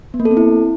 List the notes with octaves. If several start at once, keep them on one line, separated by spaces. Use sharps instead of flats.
B3
A#3
A4
C4
E4